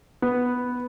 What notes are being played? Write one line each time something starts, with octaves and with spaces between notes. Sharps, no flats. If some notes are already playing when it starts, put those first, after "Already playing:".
B3